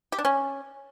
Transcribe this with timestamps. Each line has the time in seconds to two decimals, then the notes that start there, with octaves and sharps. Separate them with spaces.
0.12 G4
0.19 D4
0.25 C#4